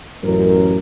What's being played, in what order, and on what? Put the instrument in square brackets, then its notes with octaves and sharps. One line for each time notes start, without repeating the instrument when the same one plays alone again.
[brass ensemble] A1 F#2 A#4